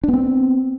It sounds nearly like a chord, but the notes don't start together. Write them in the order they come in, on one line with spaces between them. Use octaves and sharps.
D4 B3 C4